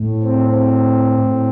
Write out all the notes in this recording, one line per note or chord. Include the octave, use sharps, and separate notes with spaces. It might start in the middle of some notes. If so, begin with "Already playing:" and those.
Already playing: A2
C4
C4
A2